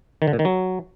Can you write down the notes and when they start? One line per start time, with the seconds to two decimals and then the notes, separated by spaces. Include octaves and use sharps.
0.22 D#3
0.27 D3
0.33 A#2
0.39 D#3
0.45 F#3